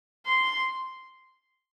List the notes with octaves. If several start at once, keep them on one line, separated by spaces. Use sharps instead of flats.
C6